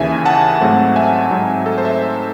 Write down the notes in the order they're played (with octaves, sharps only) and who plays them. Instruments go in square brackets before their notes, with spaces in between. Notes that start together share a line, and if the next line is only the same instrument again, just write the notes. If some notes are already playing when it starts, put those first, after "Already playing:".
Already playing: [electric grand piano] D#2 C#3 E3 E5 G#5
F#5 A5
G#2 F#3 A3 C4
E5 G#5
G#2 F#3 C4 D#4
A4
C5
E5